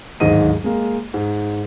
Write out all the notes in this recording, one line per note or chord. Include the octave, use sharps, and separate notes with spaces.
D1 D#2 G#2 D#5 D#7
G#3 A#3
G#2